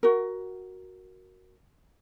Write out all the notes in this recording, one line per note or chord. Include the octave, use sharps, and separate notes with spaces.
F#4 A#4